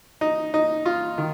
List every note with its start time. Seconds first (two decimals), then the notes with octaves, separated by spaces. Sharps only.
0.21 D#4
0.54 D#4
0.86 F4
1.18 D#3